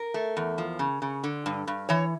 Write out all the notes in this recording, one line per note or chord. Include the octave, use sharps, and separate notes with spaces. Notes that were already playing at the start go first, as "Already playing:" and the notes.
Already playing: A#4
A3
E2
F3
C#3
C#3
D3
G2
G2
E3 C#5